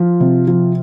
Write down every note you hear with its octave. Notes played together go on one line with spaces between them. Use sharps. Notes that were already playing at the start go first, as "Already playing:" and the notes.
Already playing: F3 F4
C3
F3